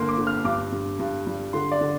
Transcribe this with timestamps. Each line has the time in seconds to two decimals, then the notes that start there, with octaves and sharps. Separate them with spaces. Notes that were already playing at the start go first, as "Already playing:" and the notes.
Already playing: G1 D3 A#3 C6
0.09 D6
0.18 D3
0.27 F6
0.45 G2 D6
0.72 G2
0.99 G2
1.27 G3
1.53 D3 C6
1.72 D5
1.81 D3